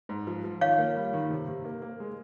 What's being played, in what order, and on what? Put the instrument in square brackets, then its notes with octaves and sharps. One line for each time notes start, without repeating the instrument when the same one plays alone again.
[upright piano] G#2
F3
F3
[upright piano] D#3 [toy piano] C#5 F5
[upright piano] A#3
G3
D#3
C3
C3
A#3
A#3
G#3